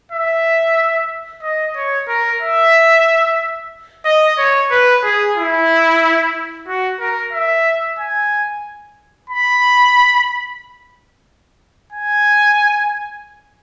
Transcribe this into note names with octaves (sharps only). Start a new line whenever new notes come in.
E5
D#5
C#5
A#4
E5
D#5
C#5
B4
G#4
E4
F#4
A#4
E5
G#5
B5
G#5